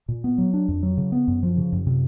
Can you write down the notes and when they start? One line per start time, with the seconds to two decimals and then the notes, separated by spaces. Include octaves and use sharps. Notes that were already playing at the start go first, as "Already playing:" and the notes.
0.08 A#2
0.24 B3
0.38 F#3
0.54 D4
0.68 F2
0.83 F#3
0.97 C#3
1.12 B3
1.28 F#2
1.43 F3
1.57 C#3
1.72 F#2
1.87 C3